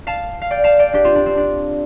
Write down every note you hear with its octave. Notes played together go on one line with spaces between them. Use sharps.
F5 A5
F5
D5 G5
F5 A5
D5 G5
D4 G4
C4 F4
D4
C4
D4